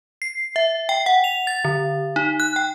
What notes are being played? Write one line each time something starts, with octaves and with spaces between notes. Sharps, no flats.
C7
E5
G5
F#5
F7
A6
D3
D#4
F#6
G5